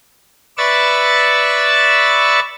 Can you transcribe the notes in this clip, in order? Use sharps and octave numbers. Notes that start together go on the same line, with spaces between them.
B4 D5 E5 C#6 E6 A6